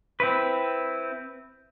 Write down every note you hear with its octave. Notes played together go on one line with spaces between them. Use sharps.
C4 E4 B4